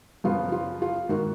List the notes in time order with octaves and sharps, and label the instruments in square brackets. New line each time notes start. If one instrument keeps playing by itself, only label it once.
[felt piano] F#2 C#3 F3 B3 F4
F4
F4
G#2 D#3 A#3 F#4